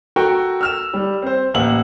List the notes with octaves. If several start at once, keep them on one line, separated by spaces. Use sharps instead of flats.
F#4 A4 A#4 G5 C#6
E6 F6 E7
G3
C4 C5
A1 A#3 F#5 E6 F#7